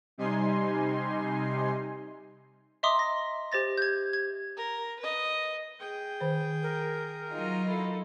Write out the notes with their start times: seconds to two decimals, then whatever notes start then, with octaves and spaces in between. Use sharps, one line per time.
0.18 C3 G3 D#4 G#5 C6 C7
2.83 D#5 E5 A#5 C6 D6 D#6
2.99 A#6
3.52 G4 C5 A6 A#6
3.78 G6 G#6
4.13 G#6
4.57 A#4
5.00 B4 D#5
5.80 G#4 G5
6.21 D#3 C5
6.63 A#4
7.31 F#3 D#4 F4
7.66 E4 A4